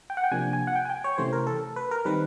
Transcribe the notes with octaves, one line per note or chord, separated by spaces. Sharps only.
G5
F#5
G5
C3 F3 A#3 D4 G#5
G#5
F#5
G5
G#5
G5
C#5
C3 E3 A3 C#4 C5
A#4
A4
B4
A#4
D#3 G3 C4 B4